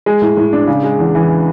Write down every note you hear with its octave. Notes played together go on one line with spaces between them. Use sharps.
G#3
A2
A2
D4
C#3
G#3
E2
E3